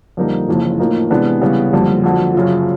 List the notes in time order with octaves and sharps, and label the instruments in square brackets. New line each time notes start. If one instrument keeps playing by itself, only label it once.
[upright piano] F2 D3 G3 A#3 D#4
F#1 F2 C#3 E3
A2 F3 A#3 D#4
C3 E3 G#3 B3 D4
C#3 E3 G3 B3
F#1 F2 D3 G3
F2 D3 F#3
F#2 C#3 F3